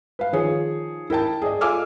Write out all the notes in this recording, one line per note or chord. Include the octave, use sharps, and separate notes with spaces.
B4 F5
D#3 F3 G#4 C#5
E4 A#4 G5 A5
G#4 D5 D#5
F4 A4 G#5 D6 E6 F6